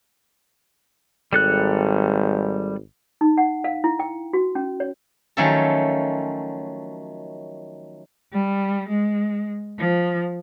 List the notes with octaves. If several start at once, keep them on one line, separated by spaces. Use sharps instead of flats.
G#1 G3 A4 F#6
D#4
F#5
F5
E4
G5
F#4
C#4
C#5
D#3 F3 F#3 A3 C#4 A4
G3
G#3
F3